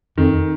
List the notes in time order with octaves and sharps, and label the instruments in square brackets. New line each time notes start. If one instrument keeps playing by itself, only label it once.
[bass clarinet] F2 [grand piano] D#3